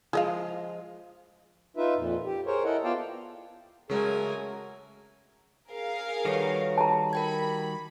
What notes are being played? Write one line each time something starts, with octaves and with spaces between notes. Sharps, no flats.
F3 G#3 G#4 D#5 F5
D#4 F4 B4 E5
F2 A#2
G4
G#4 A#4 C5 C#5
E4 A4 A#4 D#5 F#5
B3 F4 D5 F5 G5 A5
C#3 F#3 G#3 A3 G#4 A#4 C#5 G#5
G#4 A#4 F5
D#3 G3 F#4 A4 B4 C#5
A5 A#5
A#4 G5 B5 G#6